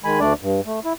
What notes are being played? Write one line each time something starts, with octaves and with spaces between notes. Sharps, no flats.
D#3 G#3 G#5 B5
D2 A3 D4 D5
G2
A3
E4